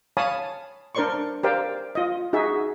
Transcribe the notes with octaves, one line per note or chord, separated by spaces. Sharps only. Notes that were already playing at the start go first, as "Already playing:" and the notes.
C#5 F5 G#5 A5 B5 D#6
D4 A#4 C5 D5 C6 C#6
G4 A#4 C5 D5 F5 G5
F4 D#5
D#4 F#4 G#4 E5